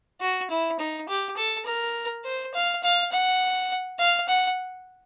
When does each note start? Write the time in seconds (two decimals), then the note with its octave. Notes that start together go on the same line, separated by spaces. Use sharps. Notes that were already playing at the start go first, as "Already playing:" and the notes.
0.21 F#4
0.50 E4
0.79 D#4
1.09 G4
1.37 A4
1.66 A#4
2.25 C5
2.54 F5
2.83 F5
3.12 F#5
3.99 F5
4.28 F#5